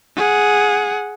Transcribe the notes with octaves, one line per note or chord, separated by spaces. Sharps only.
G#4 F#5